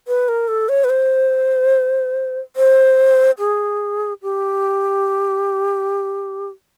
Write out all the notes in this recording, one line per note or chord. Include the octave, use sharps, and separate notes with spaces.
B4
A#4
A4
C#5
B4
C5
C5
G#4
G4